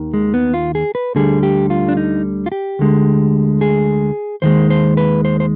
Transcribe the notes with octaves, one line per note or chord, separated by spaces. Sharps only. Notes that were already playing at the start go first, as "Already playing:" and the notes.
Already playing: D#2 D#3
G#3
B3
F4
G#4
B4
D2 D3 G3 G#4
G4
F4
D4
D#4
F4
G4
D2 D3 G#3
G#4
D#2 D#3 G#3 C5
C5
B4
C5
C5